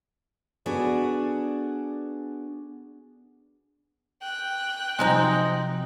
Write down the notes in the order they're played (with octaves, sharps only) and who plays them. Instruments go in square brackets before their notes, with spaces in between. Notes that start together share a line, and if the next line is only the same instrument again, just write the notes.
[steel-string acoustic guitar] B3 D4 F#4 G#4 A4 D5
[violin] G5 F#6
[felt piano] C3 F3 F#3 [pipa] G#3 C4 D#4